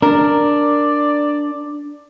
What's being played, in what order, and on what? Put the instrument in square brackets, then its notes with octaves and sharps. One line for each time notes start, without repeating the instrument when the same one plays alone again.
[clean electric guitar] D4 [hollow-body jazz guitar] A#4 [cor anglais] D5